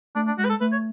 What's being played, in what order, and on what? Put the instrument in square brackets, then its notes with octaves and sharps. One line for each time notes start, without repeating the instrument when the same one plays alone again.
[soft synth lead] A3 [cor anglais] D4
[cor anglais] D4
[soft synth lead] G#3 [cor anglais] F#4
[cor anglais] B4
A4
[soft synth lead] A3 [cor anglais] B4
[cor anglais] C#5